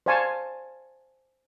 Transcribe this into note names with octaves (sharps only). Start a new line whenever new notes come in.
C5 D5 F5 G#5 A5 C#6